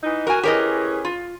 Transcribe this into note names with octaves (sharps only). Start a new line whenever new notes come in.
E3 D#4
F#4 A#4 G#5
E3 C#4 G4 G#4 A#4 D#5
F4